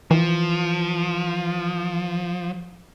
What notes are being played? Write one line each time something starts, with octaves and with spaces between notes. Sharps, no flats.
E3 F3